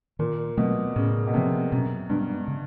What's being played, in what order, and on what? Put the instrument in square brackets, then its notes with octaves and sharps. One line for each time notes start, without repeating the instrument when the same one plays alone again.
[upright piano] A#2 [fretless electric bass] D#3
[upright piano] B2 [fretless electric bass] F#3 A3 C4
[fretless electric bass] A2 [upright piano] C#3
[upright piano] B2
[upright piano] C3 [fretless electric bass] F3 A#3
[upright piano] F#2 [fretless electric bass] B2
[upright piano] G2 [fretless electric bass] G#3 B3 D4
[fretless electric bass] C#3